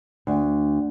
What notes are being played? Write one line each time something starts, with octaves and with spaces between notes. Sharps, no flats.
D2